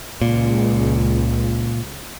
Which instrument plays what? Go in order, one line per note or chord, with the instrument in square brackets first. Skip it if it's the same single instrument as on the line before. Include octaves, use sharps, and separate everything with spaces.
[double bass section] C#2 [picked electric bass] A#2